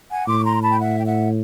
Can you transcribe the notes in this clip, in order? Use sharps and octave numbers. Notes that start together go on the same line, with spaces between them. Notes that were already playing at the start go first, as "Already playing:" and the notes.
F#5 G#5
A2 C6 D6
C#6
A#5 C6
C6
A5 B5
G5
E5 F#5
G5
E5 F#5